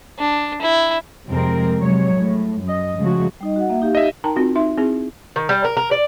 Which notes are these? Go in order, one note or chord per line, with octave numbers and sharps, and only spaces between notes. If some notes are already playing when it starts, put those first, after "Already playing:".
D4
E4
F2 C3 G#3 C4 A#4
C3 F#3 G#3 C#5
A2
F#2 D#5
C#3 F3 G#3 A3 F#4
G3 D#4 D#5
F#4 F#5
A#3 E5
D#4 G4 F5
D#5 E5
D#4 A#4 G5 A5 A#5
C4 D#4 F4 F#4
D#4 E5 C6
C4 E4 G#4
D#3
G3
A#4
A#4
D5